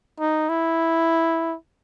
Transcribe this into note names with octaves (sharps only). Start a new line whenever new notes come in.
D#4
E4